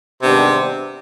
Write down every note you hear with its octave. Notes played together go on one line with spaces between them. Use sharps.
G#2 C3 D#3 G3 B3 D4